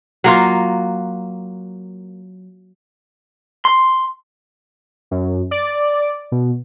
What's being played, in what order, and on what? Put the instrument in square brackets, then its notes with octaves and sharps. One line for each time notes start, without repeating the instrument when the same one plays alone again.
[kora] F#3 A#3 F4
[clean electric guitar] C6
[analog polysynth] F#2
D5
B2